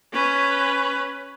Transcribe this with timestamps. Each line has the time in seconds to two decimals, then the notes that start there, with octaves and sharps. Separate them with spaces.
0.13 C#4 B4